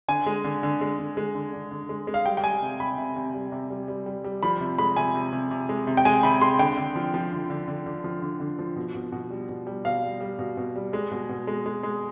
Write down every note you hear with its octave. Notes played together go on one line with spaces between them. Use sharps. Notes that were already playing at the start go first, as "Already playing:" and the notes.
D3 G#5
G#3
D3
D3
G#3
D3
G#3
D3
D3
D3
G#3
G#3
F5
G3 G5
G5
G3 G#5
C3
C3 B5
C3
C3
G3
C3
G3
G3
G3
G3
F3 B5
C3
G#3 B5
C3 G#5
C3
C3
C3
G#3
C3
G5
G#3 G#5
C3 B5
G#3 C6
D3 G5
D3
F3
F3
D3
D3
D3
D3
F3
D3
D3
F3
B2
B2
B2
G3
B2
G3
B2 F5
G3
G3
B2
B2
G3
G#3
B2
B2
G#3
G#3
G#3